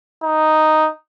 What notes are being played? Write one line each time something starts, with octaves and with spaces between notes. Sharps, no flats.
D#4